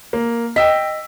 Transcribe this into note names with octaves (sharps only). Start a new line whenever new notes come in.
A#3
D#5 G5 E6 B6